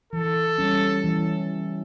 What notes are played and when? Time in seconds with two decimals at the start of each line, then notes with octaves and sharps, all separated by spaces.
0.13 E3 A4
0.58 G3 C#4
1.04 E3